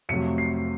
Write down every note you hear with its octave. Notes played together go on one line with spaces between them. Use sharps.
F2 C3 F#3 A3 C#7
C7